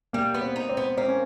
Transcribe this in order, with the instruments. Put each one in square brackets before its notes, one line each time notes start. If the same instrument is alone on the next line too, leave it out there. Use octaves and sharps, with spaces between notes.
[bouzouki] G3 [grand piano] A#3
[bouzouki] B3
[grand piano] C4
[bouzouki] D#4
[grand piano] C4
[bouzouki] B3
[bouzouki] A#3 [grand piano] C4
[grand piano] C#4